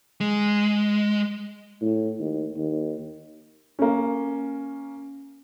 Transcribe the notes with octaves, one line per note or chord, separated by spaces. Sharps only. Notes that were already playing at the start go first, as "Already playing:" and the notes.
G#3
A2
D#2
D#2
A#3 C#4